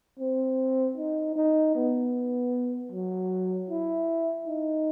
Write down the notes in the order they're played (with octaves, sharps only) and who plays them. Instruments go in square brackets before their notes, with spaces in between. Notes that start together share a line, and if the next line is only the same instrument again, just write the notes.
[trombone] C4
D#4
D#4
B3
F#3
E4
D#4